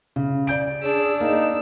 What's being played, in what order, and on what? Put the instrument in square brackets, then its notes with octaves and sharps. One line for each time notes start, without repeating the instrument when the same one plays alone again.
[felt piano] C#3
D5 G6 D7
[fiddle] D4 E6 [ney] G#4
[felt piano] A#3 [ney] D#4